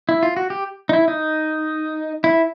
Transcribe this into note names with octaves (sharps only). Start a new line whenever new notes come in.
E4
F4
F#4
G4
D#4
E4
D#4
E4